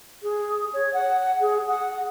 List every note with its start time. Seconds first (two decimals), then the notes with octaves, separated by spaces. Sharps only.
0.23 G#4
0.74 C#5
0.94 F#5
1.41 G#4
1.68 F#5